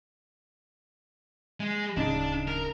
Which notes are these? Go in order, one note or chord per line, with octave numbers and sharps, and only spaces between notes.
G#3
D1 C#3 D4 D#4
A#4